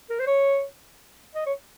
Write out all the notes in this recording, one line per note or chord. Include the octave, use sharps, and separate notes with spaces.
A#4
C5
C#5
D#5
C#5